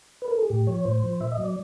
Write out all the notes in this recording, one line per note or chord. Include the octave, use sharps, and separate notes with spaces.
B4
A#4
A4
G#4
A2 G4
F3 C#5
A2 C5
F3
A#2 E5
D#5
F#3
D5